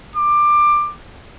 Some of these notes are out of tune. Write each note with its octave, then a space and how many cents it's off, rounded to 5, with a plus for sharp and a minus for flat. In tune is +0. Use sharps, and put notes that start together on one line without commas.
D6 +20